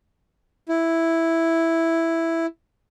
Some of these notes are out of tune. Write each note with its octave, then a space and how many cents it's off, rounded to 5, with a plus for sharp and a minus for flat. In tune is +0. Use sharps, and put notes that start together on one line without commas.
E4 +0